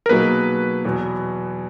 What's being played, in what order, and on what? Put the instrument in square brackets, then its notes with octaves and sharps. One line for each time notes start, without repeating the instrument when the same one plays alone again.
[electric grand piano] A#4
[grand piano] B2 F#3 A#3 D#4 G#4 [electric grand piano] B4
[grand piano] E2 B2 F#3 B3